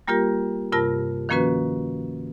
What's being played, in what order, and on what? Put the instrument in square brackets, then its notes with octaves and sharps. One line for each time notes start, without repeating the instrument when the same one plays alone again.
[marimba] G3 A#3 F4 G4 A#4
G2 C3 F4 A#4 A5 A#6
D#3 F3 A#3 C#4 F#4 B4